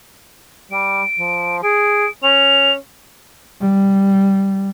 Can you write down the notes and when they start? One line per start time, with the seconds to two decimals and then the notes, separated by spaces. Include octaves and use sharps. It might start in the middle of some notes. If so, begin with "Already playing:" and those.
0.72 G3 D7
1.19 F3
1.63 G#4 D7
2.23 C#4 F7
3.61 G3